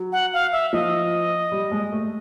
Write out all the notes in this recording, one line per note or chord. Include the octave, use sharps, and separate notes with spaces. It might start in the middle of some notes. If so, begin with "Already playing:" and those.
Already playing: F#3
F#5
F5
E5
F3 D#5
G3
G#3
A3